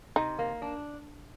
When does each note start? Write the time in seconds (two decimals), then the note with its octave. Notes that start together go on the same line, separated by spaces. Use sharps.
0.16 C3 D#4
0.39 A#3
0.62 D4